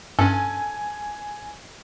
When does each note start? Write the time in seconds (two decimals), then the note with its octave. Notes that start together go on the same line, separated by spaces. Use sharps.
0.19 G2 C#4 A4 G#5